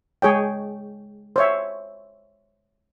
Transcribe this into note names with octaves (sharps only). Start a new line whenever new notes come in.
G#3 G#4 C#5 G5
C5 C#5 E5